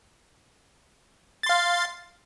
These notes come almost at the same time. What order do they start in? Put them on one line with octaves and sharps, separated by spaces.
A6 C6 F5